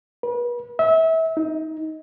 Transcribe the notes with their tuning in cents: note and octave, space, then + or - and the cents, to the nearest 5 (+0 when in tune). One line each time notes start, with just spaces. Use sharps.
B4 -35
E5 -30
D#4 +20